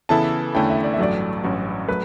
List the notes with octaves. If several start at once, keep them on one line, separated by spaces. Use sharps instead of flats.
C#3 E3 B3 E4 A4 A5
E2 D3 A3 C#4 E4 G5
E5
D5
E5
A1 G2 F#3 A3 D5
A1 G2 F#3 C#4 F#4
F#3 A3 B4